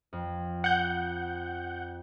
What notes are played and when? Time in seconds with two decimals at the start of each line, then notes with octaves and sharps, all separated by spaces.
0.13 F2
0.64 F#5 G6